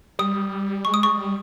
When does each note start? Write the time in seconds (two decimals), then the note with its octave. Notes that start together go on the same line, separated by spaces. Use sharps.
0.19 G3 D#6
0.85 G#3 C#6
0.94 D#6
1.03 C#6
1.17 G3